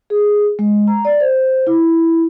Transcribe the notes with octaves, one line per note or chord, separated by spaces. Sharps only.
G#4
G#3
A#5
D5
C5
E4